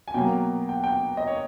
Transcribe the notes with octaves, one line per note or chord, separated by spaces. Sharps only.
G#5
B2 F#3 A#3 G5
G5
G5
D#5
C#5